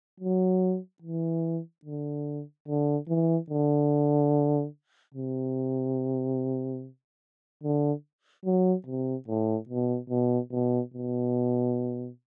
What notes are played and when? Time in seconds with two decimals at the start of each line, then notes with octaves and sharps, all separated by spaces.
0.21 F#3
1.02 E3
1.85 D3
2.68 D3
3.08 E3
3.50 D3
5.15 C3
7.64 D3
8.46 F#3
8.87 C3
9.28 A2
9.69 B2
10.10 B2
10.52 B2
10.94 B2